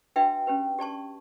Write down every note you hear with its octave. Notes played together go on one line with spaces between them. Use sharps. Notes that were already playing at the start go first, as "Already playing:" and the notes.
D4 F#4 B4 E5 G5
C#4 G4 B4
G4 D5 A5 C#6